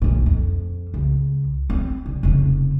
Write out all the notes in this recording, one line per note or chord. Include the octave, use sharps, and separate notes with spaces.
B1 A#2
F2
C#2
C4
C2
F1 C#3